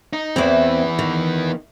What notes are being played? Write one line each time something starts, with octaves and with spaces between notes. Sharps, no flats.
D#4
E2 E3 B3 C4
D#3